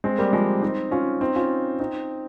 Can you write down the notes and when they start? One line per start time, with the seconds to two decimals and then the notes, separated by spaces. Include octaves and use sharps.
0.04 G#3 C4
0.18 G3 A#3
0.33 F3 G#3
0.62 C4 D#4
0.91 C#4 F4
1.21 C4 D#4
1.36 C#4 F4
1.80 C4 D#4